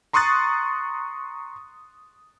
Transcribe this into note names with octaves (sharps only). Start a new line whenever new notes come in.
A#5 C6 C#6 D#6 F#6 A6